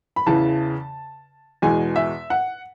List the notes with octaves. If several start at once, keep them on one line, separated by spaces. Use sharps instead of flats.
B5
E2 C#3 E3 A5
E2 B2 G#3 G#5
E5
F#5